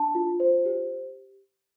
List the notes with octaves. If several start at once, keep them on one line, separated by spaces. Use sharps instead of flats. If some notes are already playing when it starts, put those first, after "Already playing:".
Already playing: D4 A5
F4
C5
G4